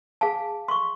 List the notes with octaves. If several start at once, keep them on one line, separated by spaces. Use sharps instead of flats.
G#4 F5 G#5 A5
C6 C#6